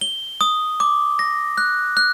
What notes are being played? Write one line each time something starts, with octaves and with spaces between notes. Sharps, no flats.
G7
D#6
D6
A#6
F#6
F#6